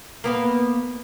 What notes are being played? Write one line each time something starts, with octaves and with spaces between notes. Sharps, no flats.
A#3 B3 B4